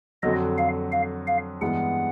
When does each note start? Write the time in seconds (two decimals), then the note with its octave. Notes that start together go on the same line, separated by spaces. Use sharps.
0.23 F2 D3 F#3 D#5
0.58 F5
0.92 F5
1.27 F5
1.61 G2 E3 G#3 B3 F#5